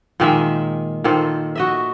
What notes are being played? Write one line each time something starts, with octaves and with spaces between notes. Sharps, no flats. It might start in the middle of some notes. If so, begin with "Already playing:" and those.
A#2 D#3 G#3 E5
A#2 D#3 A4 C5
F#4 D#5 E5